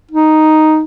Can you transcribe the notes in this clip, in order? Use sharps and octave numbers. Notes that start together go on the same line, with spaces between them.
D#4